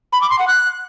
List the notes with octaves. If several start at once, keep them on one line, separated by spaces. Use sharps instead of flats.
B5
D6
C6
F#5
F#6